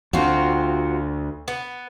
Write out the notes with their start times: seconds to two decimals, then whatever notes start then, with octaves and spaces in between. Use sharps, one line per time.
0.13 D2 C4 F4 F#4
1.48 B3